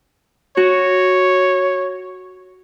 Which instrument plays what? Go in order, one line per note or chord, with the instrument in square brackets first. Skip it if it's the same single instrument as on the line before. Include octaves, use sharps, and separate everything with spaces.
[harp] F#4 [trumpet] C#5